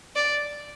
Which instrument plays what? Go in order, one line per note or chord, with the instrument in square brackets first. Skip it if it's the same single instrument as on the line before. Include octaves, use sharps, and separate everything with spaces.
[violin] D5